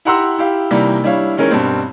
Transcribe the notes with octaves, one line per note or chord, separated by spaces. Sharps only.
E4 G4 F#5 A#5 C6 E6
E4 G4 F5
C3 D#3 E3 G3 A#3 A#4
G3 D4 E4 C#5 F5
D#3 E3 G#3 C#4 A#4 C#5
G2 B2 G3 C4